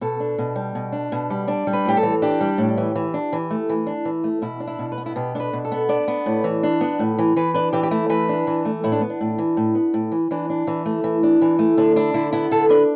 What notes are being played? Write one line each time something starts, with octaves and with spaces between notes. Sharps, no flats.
B2 A4
D4
B2
G3
B2
D4
B2
G3
D4 D5
G3
B4
A2 G4
A4
E3
D4 G4
G3
A2
E3
E3
D4
E3
A3
E3
D4
E3
A3
B2 E4
D4
E4
B2
B4
B3
E4
B2 G4
D4 A4 B4
B2
A4
B3
D4 D5
B3
A2
E3
D4
B3
A2
E3
E3 B4
D4 B4
E3 G4
G4
A3 E4
E3 B4
D4
E3
A3
A2 E4
D4
B3
D4
A2
E3
A2
B3
A2
E3
E3 D4
D4
E3
A3
E3
D4
E3
A3
D3 D4
D4 E4
D3 E4
B3 E4
D3 A4
D4 B4